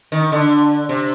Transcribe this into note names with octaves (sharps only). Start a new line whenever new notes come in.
D#3
D3
C3